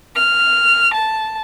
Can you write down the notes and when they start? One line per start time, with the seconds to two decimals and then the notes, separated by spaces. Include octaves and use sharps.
0.14 F6
0.93 A5